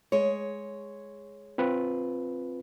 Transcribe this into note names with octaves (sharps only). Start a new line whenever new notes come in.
G#3 C#5
C4 F4 B4